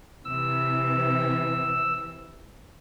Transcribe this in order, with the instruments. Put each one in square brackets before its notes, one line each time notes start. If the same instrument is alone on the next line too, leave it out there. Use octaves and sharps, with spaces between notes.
[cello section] C3 E3 [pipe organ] E6